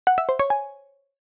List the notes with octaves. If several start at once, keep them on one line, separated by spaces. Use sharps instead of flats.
F#5
E5
C5
C#5
G#5